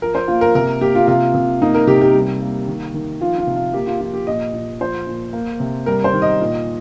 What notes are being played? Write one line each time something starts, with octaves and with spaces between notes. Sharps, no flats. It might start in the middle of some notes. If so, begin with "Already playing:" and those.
F3 A#4
C5
A#3 F4
A#4
C3 A#4
A#3 G4
F4
C3 F4
C3
A#3 D#4
A#4
C3 G4
G4
G3
A#3
D#3
D#3
F3 F4
F4
C3
F4
A#3 G4
F4
F3 F4
G4
A#2 D#5
A#2
F3 C5
A#2
A#3
C3
G3 A#4
C5
D#3
D#5
A#2